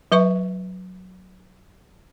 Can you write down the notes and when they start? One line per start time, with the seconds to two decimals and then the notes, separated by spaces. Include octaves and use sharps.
0.12 F#3 B4 E5 C#6